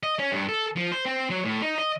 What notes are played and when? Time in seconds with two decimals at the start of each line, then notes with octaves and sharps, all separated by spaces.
0.03 D#5
0.19 C#4
0.32 G2
0.49 A4
0.76 F3
0.92 C5
1.05 C4
1.30 F#3
1.45 A2
1.62 D#4
1.78 D#5